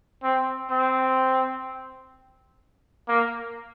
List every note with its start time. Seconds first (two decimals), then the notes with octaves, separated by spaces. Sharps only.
0.23 C4
0.70 C4
3.08 A#3